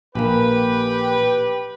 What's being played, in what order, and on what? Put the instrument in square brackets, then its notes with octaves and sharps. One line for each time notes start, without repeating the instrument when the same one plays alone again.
[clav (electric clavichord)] A#1 A#3 [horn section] G4 B4